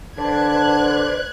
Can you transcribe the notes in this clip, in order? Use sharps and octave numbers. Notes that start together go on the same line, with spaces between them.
D3 B4 C5 D5 A5 F#6 G#6